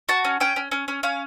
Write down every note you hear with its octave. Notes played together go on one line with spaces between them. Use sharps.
F#4 A5
C#4
C#4 G5
C#4
C#4
C#4
C#4 F5